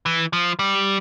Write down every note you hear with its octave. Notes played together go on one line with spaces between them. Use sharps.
E3
F3
G3